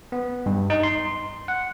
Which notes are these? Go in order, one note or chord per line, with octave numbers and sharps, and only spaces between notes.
B3
G2
D#4
C6
F#5